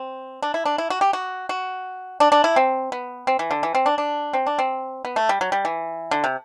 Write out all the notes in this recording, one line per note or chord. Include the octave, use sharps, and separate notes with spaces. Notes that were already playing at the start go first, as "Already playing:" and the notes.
Already playing: C4
D4
E4
D4
E4
F#4
G4
F#4
F#4
D4
D4
E4
C4
B3
C4
E3
D3
E3
C4
D4
D4
C4
D4
C4
B3
A3
G3
F#3
G3
E3
D3
C3